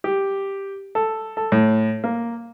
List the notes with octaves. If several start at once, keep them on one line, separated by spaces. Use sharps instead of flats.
G4
A4
A4
A2
A#3